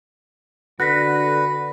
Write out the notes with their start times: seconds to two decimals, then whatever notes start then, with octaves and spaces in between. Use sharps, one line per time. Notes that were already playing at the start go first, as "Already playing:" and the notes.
0.80 D3 F#4 B4 F#6 A#6 B6